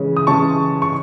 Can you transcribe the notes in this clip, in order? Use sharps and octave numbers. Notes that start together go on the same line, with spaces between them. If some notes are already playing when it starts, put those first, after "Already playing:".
Already playing: C#3 E3 G#3 C#4
D#6
C#3 E3 G#3 C#4 A5 C#6
C#6